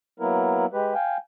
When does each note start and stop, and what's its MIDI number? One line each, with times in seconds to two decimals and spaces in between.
0.20 0.66 54
0.20 0.66 58
0.20 0.66 59
0.20 0.66 64
0.20 0.66 70
0.73 0.94 56
0.73 0.94 67
0.73 0.94 71
0.94 1.17 77
0.94 1.17 79
0.94 1.17 80